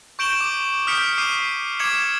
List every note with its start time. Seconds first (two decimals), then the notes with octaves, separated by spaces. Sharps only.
0.19 C#6 G6 D7 E7 F#7 G7
0.41 D6
0.87 D#6 F6 G6 B6 C#7 D7
1.18 D6 C7 D#7
1.79 D6 G#6 C#7 E7 F#7